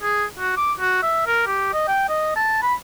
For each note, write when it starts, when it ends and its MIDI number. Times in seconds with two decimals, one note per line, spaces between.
0.03 0.25 68
0.39 0.57 66
0.57 0.73 86
0.80 0.98 66
1.03 1.24 76
1.27 1.43 70
1.47 1.72 67
1.73 1.85 75
1.88 2.05 79
2.09 2.35 75
2.36 2.61 81
2.62 2.74 83